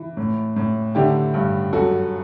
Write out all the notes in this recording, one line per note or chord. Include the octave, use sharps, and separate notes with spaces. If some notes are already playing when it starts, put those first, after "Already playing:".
Already playing: E3
A2
A2
D3 E4 G4
G2
F#2 F#4 A4